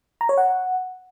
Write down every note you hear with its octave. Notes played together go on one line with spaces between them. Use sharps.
A#5
C#5
F#5